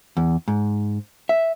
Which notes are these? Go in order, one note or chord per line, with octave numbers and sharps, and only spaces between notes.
E2
G#2
E5